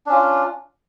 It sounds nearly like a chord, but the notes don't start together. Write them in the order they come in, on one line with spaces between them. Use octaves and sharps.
D4 C#4 F4